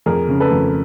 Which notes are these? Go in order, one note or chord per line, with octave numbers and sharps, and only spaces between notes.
F2 G#4 A#4
C#3
A4 B4
F2